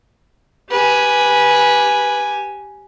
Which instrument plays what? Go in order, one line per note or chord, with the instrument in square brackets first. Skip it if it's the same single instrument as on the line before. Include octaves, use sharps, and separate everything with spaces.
[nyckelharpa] G4 G#5 [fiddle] B4